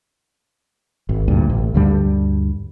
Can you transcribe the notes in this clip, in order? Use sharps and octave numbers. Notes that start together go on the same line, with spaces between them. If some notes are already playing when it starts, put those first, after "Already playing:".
G#1
D2 G2 A#2
A1
D2 G2 D3 G3